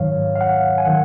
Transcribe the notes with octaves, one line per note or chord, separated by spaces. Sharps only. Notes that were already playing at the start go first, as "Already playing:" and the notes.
Already playing: G#2 D#3 F#3 C#5 F5
F5
F#5
G#5
D#3 F#3 F#5